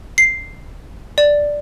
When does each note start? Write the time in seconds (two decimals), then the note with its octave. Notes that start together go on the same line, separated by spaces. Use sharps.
0.18 C7
1.18 D5